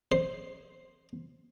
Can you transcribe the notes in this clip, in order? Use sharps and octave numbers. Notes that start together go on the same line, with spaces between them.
C5